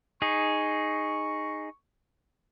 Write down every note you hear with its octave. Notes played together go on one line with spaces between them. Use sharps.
D#4 G#4 C#6